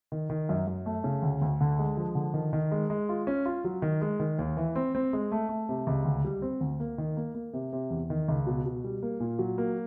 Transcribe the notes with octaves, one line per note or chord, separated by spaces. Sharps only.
D#3
D#3
F#2
F#2
A3
C#3
D2
D2
D3
G#3
F3
D3
D#3
D#3
G#3
G#3
F4
C#4
F4
F#3
D#3
G#3
D#3
D#2
E3
C4
C4
G#3
A3
A3
C3
C#2
D2
G3
C4
D2
A#3
D#3
A#3
A#3
C3
C3
E2
D#3
C#2
B2
B2
G3
A#3
A#2
F#3
A#3